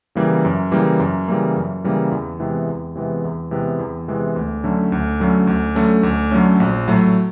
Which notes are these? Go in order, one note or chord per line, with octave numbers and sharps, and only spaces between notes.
C#3 E3 G3 A#3
F#2
C#3 E3 G3 A#3
F#2
C#3 E3 G3 A#3
F#2
C#3 E3 G3 A#3
E2
C3 E3 G#3 B3
E2
C3 E3 G#3 B3
E2
C3 E3 G#3 B3
E2
C3 E3 G#3 B3
D2
D3 F#3 A3 C#4
D2
D3 F#3 A3 C#4
D2
D3 F#3 A3 C#4
D2
D3 F#3 A3 C#4
A#1
A2 F#3 A3